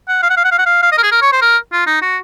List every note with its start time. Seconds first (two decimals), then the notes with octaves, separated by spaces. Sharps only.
0.08 F#5
0.23 F5
0.30 F#5
0.37 F5
0.44 F#5
0.51 F5
0.59 F#5
0.66 F5
0.82 F5
0.92 D#5
0.97 A#4
1.03 G#4
1.12 A#4
1.22 C#5
1.32 C5
1.41 A#4
1.73 F4
1.87 D#4
2.02 F#4